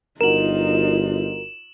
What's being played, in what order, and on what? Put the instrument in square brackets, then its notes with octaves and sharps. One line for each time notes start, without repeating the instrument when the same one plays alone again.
[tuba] G1 [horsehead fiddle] D#4 F4 [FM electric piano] F#4 A#4 [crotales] E7 F#7